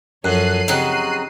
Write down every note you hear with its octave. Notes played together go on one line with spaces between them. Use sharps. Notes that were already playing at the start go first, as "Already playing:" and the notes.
F#2 F3 A4 C#5 F#6 C7 D#7
C#3 F#3 C4 D#4 G4